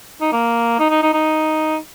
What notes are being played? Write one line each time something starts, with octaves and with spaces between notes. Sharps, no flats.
D#4
A#3
D#4
D#4
D#4
D#4